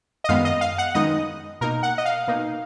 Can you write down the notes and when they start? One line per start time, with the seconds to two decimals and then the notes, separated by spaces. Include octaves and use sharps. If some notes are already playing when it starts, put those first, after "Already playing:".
0.24 D#5
0.29 F#2 D#3 G#3 B3 D#4 F5
0.45 D#5
0.61 F5
0.78 F#5
0.94 F#2 D#3 G#3 B3 D#4 D#5
1.61 B2 A#3 D#4 A#4
1.83 F#5
1.98 D#5
2.05 F5
2.27 B2 A#3 D#4